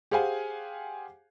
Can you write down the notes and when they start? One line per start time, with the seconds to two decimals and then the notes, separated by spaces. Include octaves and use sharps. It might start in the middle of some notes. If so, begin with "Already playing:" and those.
0.11 G4 G#4 C5 F5 F#5 G#5